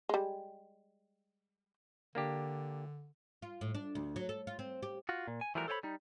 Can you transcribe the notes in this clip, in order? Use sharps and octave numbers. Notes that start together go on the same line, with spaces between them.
G3 G#3
D3 A#3 D4 G4
F4
A2
D4
D2
F#3
A4
F4
C4
G4
F4 F#4
A#2
G#5
E3 F3 G3 A3 F#4 A#4
A4 C5 C#5 G5 B5
G3 D#4